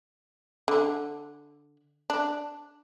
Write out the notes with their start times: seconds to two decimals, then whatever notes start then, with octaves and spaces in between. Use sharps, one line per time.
0.68 D3
2.10 D4